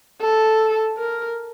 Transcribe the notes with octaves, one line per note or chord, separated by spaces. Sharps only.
A4
A#4